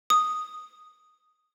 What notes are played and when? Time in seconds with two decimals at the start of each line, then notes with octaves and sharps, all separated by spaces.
0.10 D#6